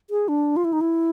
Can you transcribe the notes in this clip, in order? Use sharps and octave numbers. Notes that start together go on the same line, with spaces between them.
G#4
D4
F4
E4
D#4
E4